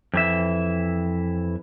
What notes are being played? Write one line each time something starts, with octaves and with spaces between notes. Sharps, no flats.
F2 E3 E5